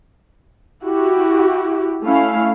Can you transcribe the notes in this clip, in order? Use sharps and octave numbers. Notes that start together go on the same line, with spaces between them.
E4 F#4 G4
A3 C#4 E4 F5